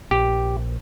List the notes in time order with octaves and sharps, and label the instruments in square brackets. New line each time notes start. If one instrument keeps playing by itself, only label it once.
[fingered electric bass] A#1 [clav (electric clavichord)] G4